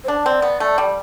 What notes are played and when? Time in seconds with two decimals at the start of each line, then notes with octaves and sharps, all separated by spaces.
0.04 C5
0.08 D4 D5
0.26 C4
0.42 B3
0.60 A3
0.78 G3